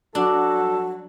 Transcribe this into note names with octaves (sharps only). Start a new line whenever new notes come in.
F#3 D4 F#4 A4